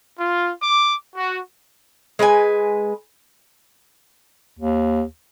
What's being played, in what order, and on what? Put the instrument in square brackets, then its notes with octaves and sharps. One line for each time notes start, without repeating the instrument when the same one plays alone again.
[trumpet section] F4
D6
F#4
[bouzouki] G#3 B4 E5 G#5
[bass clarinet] D#2